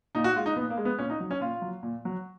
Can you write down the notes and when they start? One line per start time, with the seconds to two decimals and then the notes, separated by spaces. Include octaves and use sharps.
0.15 A#2 D#4
0.24 F#4
0.36 G#3 F4
0.46 D#4
0.56 A#2 B3
0.70 A#3
0.77 G#3
0.85 B3
0.99 A#2 C#4
1.10 D#4
1.20 F#3
1.31 C#4
1.41 A#2 F4
1.62 F#3
1.83 A#2
2.05 F#3